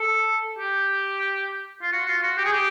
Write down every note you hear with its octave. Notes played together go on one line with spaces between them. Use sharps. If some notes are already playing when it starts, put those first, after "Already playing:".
Already playing: A4
G4
F4
F#4
F4
F#4
G4
G#4
G4